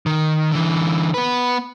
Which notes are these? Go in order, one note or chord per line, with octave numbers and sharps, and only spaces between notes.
D#3
D3 E3
B3 B4